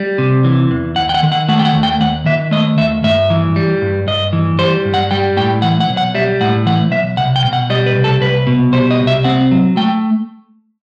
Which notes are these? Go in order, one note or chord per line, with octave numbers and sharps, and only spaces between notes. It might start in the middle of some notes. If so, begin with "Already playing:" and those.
Already playing: G3
C3
E3
E2
D#2 F#5
G5
F#5
D#3
F#5
A3 F#5
G5
F#5
D#2
G5
D#2 F#5
D#3 E5
A3 D#5
D#2 E5
G2 E5
E3
G3
G2
G2 D#5
E3
G3 C5
G2
F#5
G3 G5
A2 G5
E3 F#5
F#5
B1
F#5
G3 E5
A2 F#5
E3 F#5
B1 E5
C2 F#5
G5
B2
F#5
G3 D#5
B4
C2
A4
C2 B4
B2
G3 C5
D#5
C2
E5
C4 F#5
F#3
A3 G5